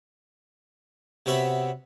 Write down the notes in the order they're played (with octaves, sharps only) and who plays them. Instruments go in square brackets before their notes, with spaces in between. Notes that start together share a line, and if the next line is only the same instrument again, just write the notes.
[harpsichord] C3 B3 F#4 C#5 E5 B5